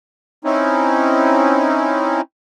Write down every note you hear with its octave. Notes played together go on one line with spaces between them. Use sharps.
C4 C#4 D#4 E4